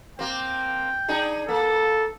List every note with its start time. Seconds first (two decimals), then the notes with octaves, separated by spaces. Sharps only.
0.19 A#3 C4 G5
1.08 D4 D#4 G#4
1.49 A#3 A4